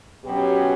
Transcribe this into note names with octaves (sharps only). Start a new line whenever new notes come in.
B2 F#3 C#4 G4